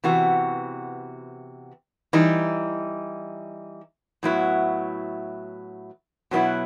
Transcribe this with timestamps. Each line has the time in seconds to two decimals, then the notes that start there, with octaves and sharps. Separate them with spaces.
0.04 C3 E3 B3 F#4
2.13 E3 G3 D#4
4.23 A2 F#3 B3 E4
6.31 B2 F#3 B3 E4